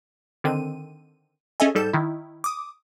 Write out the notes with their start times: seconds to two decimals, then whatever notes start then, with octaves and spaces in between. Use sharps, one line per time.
0.44 D3 D#3 C4 D#7
1.60 C#4 G#4 A4 D#5 E5 G#5
1.75 G#2 G3 A4 G6 E7
1.93 D#3 E4
2.44 D6 D#6